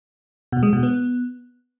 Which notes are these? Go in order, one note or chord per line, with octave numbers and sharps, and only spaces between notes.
B2
G#3
B2
B3